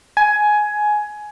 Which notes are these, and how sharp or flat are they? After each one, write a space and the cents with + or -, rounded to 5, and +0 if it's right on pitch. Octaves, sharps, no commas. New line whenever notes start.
G#5 +15